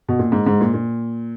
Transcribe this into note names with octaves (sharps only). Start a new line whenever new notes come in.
B2
A#2
G#2
G#2
A#2
A#2